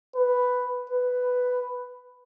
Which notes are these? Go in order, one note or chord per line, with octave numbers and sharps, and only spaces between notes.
B4
B4